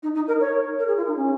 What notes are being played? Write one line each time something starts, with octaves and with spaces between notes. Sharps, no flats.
D#4
D#4
A#4
C#5
A#4
G#4
F4
D#4
C#4